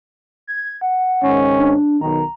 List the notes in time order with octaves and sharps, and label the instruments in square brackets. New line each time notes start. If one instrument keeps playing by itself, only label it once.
[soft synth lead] G#6
F#5
[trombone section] G#2 D#3 C#4
[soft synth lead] D4
[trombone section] B1 D#3 [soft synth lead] A#5